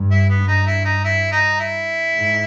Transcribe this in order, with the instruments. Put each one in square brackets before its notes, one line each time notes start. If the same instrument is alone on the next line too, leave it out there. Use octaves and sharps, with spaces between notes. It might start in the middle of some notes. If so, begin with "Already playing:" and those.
Already playing: [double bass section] G2
[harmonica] E4
B3
[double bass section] G2 [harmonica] D#4
[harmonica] E4
D#4
E4
D#4
E4
[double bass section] G#2